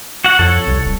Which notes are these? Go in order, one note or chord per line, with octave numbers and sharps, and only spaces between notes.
F#4 F#5
F2 A4 C#5
C2
D#1